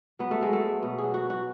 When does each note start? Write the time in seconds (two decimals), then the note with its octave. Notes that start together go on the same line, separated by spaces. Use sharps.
0.19 F#3 B3
0.31 A3
0.41 F#3 G#3
0.53 A3
0.62 F#3
0.83 B2 B3
0.98 G#4
1.04 F#3
1.14 F#4
1.25 F#3 F#4